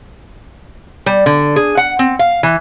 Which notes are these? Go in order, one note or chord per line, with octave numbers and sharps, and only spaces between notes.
G3
D3
G#4
F#5
C4
F5
E3